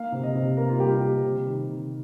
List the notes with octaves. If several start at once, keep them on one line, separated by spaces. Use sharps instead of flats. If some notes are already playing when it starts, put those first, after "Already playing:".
Already playing: A#3 F5
C3
D#5
C3
A#3 A#4
F4
G3 G4
G3 G4
C3
D#3
C3